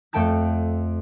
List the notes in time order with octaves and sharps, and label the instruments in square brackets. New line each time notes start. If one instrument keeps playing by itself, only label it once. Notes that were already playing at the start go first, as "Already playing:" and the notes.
[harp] F2 A3 A4 G5 A5 G#6